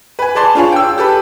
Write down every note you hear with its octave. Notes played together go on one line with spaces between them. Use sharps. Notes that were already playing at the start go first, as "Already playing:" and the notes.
B4 G#5
G#4 B4 D5 A5 C6
D4 F4 G#4 C#5
G5 E6
G4 A4 B4